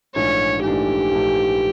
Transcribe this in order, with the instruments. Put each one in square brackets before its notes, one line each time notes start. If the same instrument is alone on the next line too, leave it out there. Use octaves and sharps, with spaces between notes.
[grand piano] A#1 G#2 E3 A3 D4 [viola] C#5
[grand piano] A#1 G#2 E3 A3 D4 [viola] G4
[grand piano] A#1 G#2 E3 A3 D4